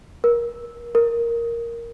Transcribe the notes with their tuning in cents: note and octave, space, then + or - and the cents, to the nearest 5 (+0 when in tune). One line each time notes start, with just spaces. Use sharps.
A#4 +25
A#4 +0